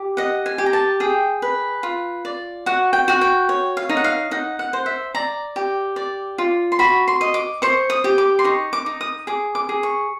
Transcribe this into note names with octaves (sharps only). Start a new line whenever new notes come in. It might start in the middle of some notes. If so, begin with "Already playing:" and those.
Already playing: G4
D#5 F#5
G#5
G4
A#5
A5
G#4 G5
B4
F4
D5
F#4 F#5
G5
F#4 F#5
G5
C#5
F5
D#4
F#5
F5
D#4 F#5
F#5
C5
E5
D5 A#5
G4
D5
F4
C6
F#4 B5
C6
D#5
D6
C5 C#6
D#6
G4
D6
C6
D#4 C#6
D6
D#4
D#6
G#4 D6
D6
G#4
C#6